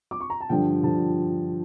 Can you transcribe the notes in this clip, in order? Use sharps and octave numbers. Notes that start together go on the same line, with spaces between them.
D6
C#6
A#5
A5
G2 D3 F3 G5
D3 F3 A5